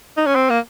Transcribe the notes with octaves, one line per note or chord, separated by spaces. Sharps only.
D#4
C#4
C4
A#3